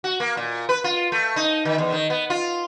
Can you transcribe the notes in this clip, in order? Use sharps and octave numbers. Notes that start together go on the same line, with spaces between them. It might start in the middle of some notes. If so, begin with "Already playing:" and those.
F#4
A#3
A#2
B4
F4
A3
D#4
D#3
E2
D#3
B3
F4